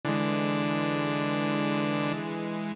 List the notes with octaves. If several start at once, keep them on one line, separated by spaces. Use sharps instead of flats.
D3 E3 G#3